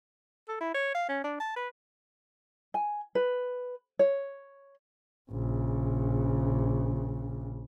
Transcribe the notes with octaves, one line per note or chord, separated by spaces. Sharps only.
A4
E4
C#5
F5
C#4
D4
A5
B4
G#5
B4
C#5
A#1 C#3